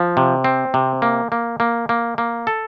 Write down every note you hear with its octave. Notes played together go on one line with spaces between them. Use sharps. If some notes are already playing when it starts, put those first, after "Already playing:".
Already playing: F3
C3
C4
C3
A#3
A#3
A#3
A#3
A#3
A4